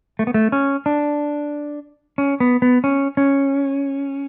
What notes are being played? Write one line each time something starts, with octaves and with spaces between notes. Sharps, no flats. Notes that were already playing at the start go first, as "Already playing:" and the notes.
A3
B3
A3
C#4
D4
C#4
B3
B3
C#4
C#4